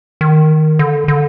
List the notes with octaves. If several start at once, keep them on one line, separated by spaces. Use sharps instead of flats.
D#3
D3
D3